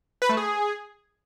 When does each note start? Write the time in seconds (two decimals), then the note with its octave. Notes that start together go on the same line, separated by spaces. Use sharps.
0.22 B4
0.29 A3
0.37 G#4